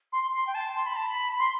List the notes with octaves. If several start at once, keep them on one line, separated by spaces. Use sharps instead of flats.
C6
C6
G5
A5
C6
B5
A5
B5
C6